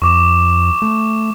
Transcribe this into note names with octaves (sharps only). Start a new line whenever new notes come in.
F2 C#6 D6 E7
A3